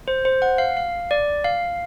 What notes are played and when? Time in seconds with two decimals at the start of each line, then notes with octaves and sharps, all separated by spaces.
0.08 C5
0.25 C5
0.42 F#5
0.58 F5
0.77 F5
1.11 D5
1.44 F5